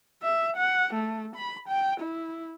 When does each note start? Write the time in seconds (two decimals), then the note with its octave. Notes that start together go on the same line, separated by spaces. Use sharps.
0.22 E5
0.57 F#5
0.94 A3
1.36 B5
1.68 G5
2.00 E4